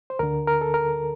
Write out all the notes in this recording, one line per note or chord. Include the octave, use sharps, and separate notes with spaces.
C5
D2 D3 A#4
A#4
A4
A#4